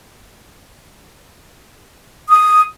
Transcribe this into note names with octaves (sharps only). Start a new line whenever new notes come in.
D#6